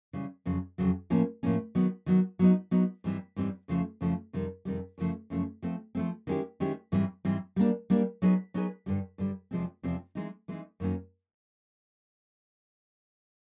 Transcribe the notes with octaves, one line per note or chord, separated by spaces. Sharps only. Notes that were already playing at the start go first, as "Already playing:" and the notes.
C#3 E3 G3
F2 C#3 F#3
F2 C#3 F#3
A2 F3 A#3 C#4
A2 F3 A#3 C#4
D#3 F#3 B3
D#3 F#3 B3
F#3 B3 D#4
F#3 B3 D#4
G#2 E3 G3 C4
G#2 E3 G3 C4
F2 C#3 F3 A3
F2 C#3 F3 A3
F2 C3 D#3 G3
F2 C3 D#3 G3
F#2 C#3 F3 A3
F#2 C#3 F3 A3
F3 A3 C4
F3 A3 C4
D#3 G#3 C#4 E4 G4
D#3 G#3 C#4 E4 G4
G#2 E3 G3 C4
G#2 E3 G3 C4
G3 A#3 D4
G3 A#3 D4
F#3 B3 D#4 G#4 B4
F#3 B3 D#4 G#4 B4
G2 D3 G3
G2 D3 G3
E2 C3 F3 G#3 C4
E2 C3 F3 G#3 C4
E3 G#3 C4 D#4
E3 G#3 C4 D#4
F#2 D#3 F#3 A#3 C#4